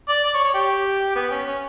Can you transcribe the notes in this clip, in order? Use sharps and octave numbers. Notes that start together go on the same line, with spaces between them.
D5
D5
C#5
C#5
G4
B3
C#4
C#4